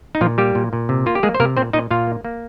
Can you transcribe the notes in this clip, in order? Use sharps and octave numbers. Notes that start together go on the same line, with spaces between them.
D#4
A#2 F3 F4
G3 A#3 G4
A#2
A#2
C3
A#3 F4
G4
G#3 A#3 G#4
C5
C3 A#3 A#4
A#2 C4 C5
A#2 D#4 D#5
A#2 F4 F5
A#3
A#3